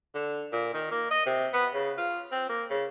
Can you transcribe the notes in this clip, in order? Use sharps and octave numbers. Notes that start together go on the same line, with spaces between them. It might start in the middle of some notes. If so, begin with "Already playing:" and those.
D3
A#2
D#3
A#3
D#5
C3
B3
C#3
F4
C4
A#3
C#3